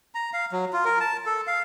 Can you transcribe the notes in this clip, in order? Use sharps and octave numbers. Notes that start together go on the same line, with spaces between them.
A#5
F5
F#3
F4
A#4
A5
A4
F5